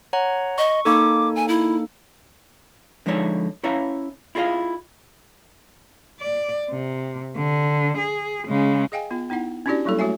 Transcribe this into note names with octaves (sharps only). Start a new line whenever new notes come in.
C#5 F#5 A#5
D#5 C#6
A#3 D#4 A4 D6
G#5
E4
D3 F3 G#3 D#4 C#5 E5
C#4 E4 C#5 E5 F5 A#5
E4 F4 G#4 D#5 F5
D5
C3
D3
G#4
C#3 G#3
G#4 D#5 F5 G5 G#5
B3 F4
B3 D#4 E4 F#5
C#4 D4 E4 F#4 G4 D5
F#3 G3 A#3 E4 A4
A3 F#4 C#5 E5 G#5